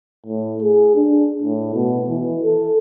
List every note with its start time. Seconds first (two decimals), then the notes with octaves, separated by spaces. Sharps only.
0.26 A2
0.62 G#4
0.96 D4
1.43 A2
1.75 B2
2.09 E3
2.43 A4